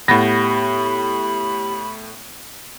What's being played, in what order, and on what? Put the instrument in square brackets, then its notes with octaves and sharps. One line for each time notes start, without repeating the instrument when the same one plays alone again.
[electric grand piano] A2 A#6 [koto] B3 [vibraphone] G4 [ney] B5